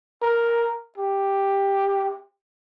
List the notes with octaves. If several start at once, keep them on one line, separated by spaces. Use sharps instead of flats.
A#4
G4